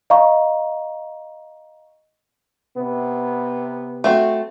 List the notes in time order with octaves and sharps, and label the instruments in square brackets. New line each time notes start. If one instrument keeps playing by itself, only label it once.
[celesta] D#5 F5 A#5 C#6
[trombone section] C3 B3
[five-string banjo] A3 C4 F#4